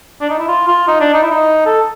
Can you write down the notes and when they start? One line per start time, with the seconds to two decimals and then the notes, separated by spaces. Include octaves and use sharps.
0.21 D4
0.30 D#4
0.39 E4
0.48 F4
0.68 F4
0.87 D#4
1.00 D4
1.14 D#4
1.22 E4
1.31 D#4
1.66 A4